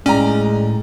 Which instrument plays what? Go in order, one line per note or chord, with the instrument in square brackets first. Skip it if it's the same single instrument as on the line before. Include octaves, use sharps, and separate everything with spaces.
[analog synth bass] A2 [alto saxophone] G#3 [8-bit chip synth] C#4 [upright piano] D5 G5 A#5